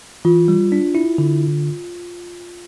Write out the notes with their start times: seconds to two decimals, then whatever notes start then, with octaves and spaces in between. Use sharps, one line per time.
0.25 E3 F4
0.48 G3
0.72 D4
0.95 E4
1.18 D3